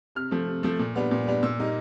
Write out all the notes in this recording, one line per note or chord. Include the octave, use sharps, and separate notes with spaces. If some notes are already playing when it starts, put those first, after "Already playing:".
C3 F6
F3 A3
C3
F3 A3
A#2
G3 B3 D4
A#2
G3 B3 D4
A#2 E6
G3 A#3 D#4